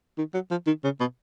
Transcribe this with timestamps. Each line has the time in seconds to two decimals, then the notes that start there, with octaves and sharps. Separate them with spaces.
0.18 D#3
0.34 F#3
0.50 F3
0.67 D#3
0.84 C#3
1.00 B2